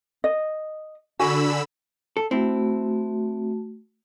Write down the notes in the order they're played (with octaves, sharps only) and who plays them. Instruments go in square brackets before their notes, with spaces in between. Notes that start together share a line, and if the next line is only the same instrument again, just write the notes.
[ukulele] D#5
[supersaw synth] D3 B5 E6 [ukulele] F#4 G#5
[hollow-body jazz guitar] A4
[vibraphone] A3 F#4 [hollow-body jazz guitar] C4 E4